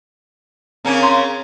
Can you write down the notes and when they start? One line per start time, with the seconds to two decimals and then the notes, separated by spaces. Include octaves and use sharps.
0.85 C#3 A#3 C4 C#4
1.02 A#5 C6